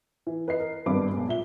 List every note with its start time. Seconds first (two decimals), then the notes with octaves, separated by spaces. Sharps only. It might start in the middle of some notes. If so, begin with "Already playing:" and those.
0.27 E3
0.48 B4 D#5 C7
0.60 A#4
0.86 G#1 G2 B3 D4 B5 D6
1.12 B1 G#3
1.27 A#2 E5 G7